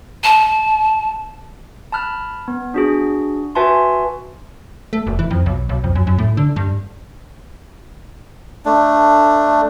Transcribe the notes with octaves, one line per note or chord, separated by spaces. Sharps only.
A5
A5 B5 F6 F#6
B3
D4 F#4 G#4
F#4 B4 E5 G#5 A5 C6
A3
E1
E3
F2
B1
B1
F2
F#2
F#2
A2
D3
G2
A3 D4